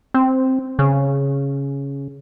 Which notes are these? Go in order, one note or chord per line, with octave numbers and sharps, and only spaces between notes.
C4
C#3